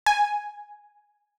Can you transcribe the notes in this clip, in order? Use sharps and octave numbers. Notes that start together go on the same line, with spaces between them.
G#5